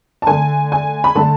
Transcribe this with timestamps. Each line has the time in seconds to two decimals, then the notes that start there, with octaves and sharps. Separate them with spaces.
0.22 A5
0.27 D3 A3 G#5
0.72 G#5
1.04 B5
1.15 D3 A3 A5